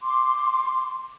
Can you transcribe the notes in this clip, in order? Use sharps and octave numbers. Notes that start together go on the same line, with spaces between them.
C6 D6